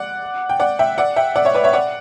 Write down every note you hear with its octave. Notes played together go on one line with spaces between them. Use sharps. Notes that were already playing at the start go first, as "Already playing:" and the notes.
Already playing: D5 F#5
G5
D5 F#5
E5 G5
D5 F#5
E5 G5
D5 F#5
C#5 E5
B4 D5
C#5 E5
D5 F#5